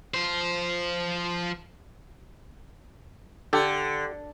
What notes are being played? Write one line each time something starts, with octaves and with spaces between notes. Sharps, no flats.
F3 C5
D3 G4 A4